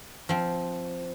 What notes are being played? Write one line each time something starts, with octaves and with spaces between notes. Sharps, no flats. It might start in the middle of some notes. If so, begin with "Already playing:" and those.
F3 C4